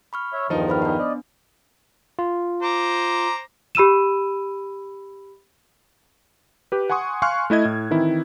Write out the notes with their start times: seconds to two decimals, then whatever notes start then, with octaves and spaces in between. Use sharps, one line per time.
0.13 B5 C#6 F6
0.33 C#5 E5
0.50 E2 G2 D#3 F3 D#4
0.68 C5 B5 F6
0.82 B3 D4
0.98 D5 D#5
2.19 F4
2.62 C5 A#5 D6
3.75 G4 B5 E6 D#7 E7
6.72 G4 B4
6.90 F#5 G#5 C6 C#6 D#6
7.22 F5 G#5 C6 C#6 F6 F#6
7.50 A3 E4 D#5 G#6
7.65 A2
7.91 D#3 E3 C4 E4